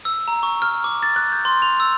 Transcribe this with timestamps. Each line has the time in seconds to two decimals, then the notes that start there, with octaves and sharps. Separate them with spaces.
0.05 E6
0.28 A#5
0.43 C#6
0.62 F6
0.84 D6
1.03 A6
1.16 F#6
1.32 G6
1.45 C6
1.62 F7
1.80 E6